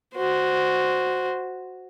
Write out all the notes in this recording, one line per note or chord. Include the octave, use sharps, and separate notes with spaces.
F#4 C5